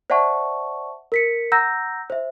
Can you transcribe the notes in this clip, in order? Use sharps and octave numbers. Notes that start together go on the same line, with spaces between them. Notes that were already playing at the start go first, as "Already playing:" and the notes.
C5 D5 E5 F#5 A5 C#6
A#4 B6 C#7
F#5 A#5 E6 G6 A#6
C5 E5